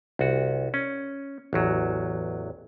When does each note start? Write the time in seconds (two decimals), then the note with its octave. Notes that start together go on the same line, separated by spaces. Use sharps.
0.19 C2 F#4
0.74 C#4
1.53 A1 E2 F#3